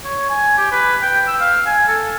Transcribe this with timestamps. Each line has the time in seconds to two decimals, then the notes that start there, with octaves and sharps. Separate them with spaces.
0.04 C#5
0.29 G#5
0.57 G4
0.72 B4
1.02 G5
1.27 E6
1.40 F5
1.66 G#5
1.88 A4